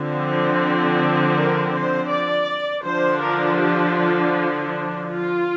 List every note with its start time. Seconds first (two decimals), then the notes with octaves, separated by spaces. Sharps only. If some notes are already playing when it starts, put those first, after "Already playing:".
Already playing: D3 F3 C4
1.34 A#4
1.71 C5
2.08 D5
2.83 D3 F3 D4 C5
3.21 A#4
3.58 G4
3.96 F4
4.33 D4
5.09 F4